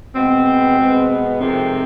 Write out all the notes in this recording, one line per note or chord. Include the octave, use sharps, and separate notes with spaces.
B2 G#3 B3 C4
B2 G#3 B3
F2 C3 D#3 G#3 C4